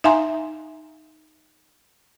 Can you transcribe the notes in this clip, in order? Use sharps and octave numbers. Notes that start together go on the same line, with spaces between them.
D#4 E5 F5 G#5 A#5 C6